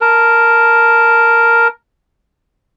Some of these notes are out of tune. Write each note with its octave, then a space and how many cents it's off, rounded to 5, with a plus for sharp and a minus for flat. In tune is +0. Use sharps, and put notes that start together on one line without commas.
A#4 +0 A5 +0